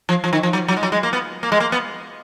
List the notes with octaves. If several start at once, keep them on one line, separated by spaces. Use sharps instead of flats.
F3
F3
D#3
F3
F#3
F#3
G#3
F#3
G#3
A#3
B3
A#3
G#3
A#3
B3